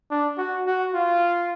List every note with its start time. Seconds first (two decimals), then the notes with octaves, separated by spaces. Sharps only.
0.11 D4
0.38 F#4
0.66 F#4
0.94 F4